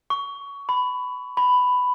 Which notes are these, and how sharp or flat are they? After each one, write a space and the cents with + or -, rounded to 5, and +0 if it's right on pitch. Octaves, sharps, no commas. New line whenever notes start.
C#6 +20
B5 +20
B5 +10